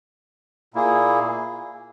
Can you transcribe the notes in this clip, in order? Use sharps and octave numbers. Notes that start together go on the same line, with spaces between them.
A#2 A#3 E4 G#4